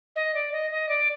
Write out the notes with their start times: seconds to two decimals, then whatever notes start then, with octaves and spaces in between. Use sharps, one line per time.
0.16 D#5
0.34 D5
0.52 D#5
0.71 D#5
0.89 D5